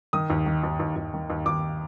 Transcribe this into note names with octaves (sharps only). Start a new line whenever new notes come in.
D#3 D#6
D#2
D#3
D#2
D#2
D#2
D#3
D#2
D#2 D6